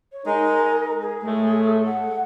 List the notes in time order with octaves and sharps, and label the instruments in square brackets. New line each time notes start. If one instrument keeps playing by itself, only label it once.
[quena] C#5
[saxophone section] G#3 D#4 [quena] A#4
[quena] G#4
[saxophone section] A2 G#3 A3
[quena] F#5